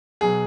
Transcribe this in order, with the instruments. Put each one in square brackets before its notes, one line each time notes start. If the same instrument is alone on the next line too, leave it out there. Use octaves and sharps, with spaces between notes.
[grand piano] B2 F#3 G#4